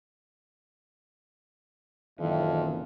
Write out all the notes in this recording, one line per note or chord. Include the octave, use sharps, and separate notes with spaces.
F#1 F2 A#2 D#3 E3 E5